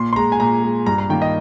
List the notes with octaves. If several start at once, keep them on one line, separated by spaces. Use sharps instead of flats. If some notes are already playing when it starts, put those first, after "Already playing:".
Already playing: A#2 C6
C6
G#3 A#5
G#5
A#2 A#5
G#3
G2 A#5
A#5
D#3 A#3 G5
D#5